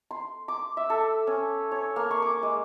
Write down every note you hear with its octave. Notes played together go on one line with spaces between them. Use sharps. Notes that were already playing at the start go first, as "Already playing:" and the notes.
C6
D6
E5
A4
C#4
C#5
A#3
C#6
D6
G#3